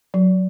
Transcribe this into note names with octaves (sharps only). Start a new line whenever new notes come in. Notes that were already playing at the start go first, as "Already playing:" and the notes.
F#3